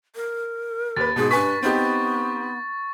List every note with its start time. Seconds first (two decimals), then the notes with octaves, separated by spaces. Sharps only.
0.16 A#4
0.96 D#2 B4 A6
1.16 G#2 B2 G#4
1.31 G2 B4 G#5 C#6 B6
1.62 B3 C4 D#4 G4